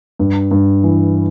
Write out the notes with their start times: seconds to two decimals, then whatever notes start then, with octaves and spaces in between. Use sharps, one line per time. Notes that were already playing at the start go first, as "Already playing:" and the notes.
0.19 G2
0.51 G2
0.84 E3